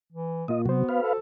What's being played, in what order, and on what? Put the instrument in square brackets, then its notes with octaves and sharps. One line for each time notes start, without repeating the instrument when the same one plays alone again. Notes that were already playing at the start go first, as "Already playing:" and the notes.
[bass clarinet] E3
[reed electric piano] A#2 A#3 F4 [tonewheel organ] D#5
[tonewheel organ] C3 F#3 [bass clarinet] B3 [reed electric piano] F#4 C5
[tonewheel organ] B4 F5
[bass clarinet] A4